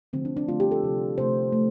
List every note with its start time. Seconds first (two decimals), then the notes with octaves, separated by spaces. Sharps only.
0.13 D3 F3 A3 C4
0.25 D4
0.37 D4
0.48 D3 F3 A3 F4
0.60 G4
0.71 A4
0.83 C3 F3 A3
1.18 C3 F3 A3 C5
1.52 A3